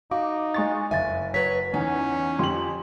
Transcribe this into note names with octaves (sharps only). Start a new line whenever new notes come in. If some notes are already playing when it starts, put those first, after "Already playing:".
D#4 F#4 F5 D6
G#3 C#6 A6
F#1 F2 G#2 E5 F5 G#5 A6
F#3 B4 C#5 B6
E2 C#4 D#4
F2 G4 C6 F#7